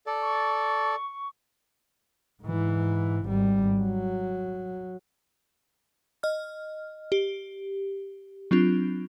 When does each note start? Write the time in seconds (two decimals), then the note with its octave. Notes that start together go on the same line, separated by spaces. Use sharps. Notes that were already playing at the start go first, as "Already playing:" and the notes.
0.07 A4 D5
0.22 C#6
2.43 G#2 E3
3.26 G#1 G3
3.80 F#3
6.23 D#5 F6
7.12 G4
8.51 F#3 C4 D4 F4